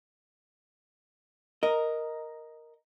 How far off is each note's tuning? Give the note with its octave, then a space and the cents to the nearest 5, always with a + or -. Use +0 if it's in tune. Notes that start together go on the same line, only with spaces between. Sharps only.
A#4 +0 D#5 +0